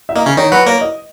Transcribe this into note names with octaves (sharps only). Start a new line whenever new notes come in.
E5
A#3 D#5
C#3 C#4
D#3 D#4 C#5
F#3 F#4 B4
A#3 A#4 C#5
D#5